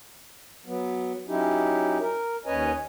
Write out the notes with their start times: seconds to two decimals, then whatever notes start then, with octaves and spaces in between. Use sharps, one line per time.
0.66 F#3 B3
1.28 F#3 C#4 D#4 E4 G4
1.99 A#4
2.46 D#2 C#4 B4 C#5 D#5 G#5